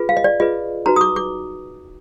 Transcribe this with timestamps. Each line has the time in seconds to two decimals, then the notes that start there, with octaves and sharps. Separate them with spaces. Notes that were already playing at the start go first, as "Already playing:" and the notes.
Already playing: F4 G#4 B4
0.09 F5
0.17 D#5
0.24 D5
0.40 F4 G#4 B4 D#5
0.86 D#4 F#4 B4 A#5
0.96 D#6
1.01 D6
1.16 D6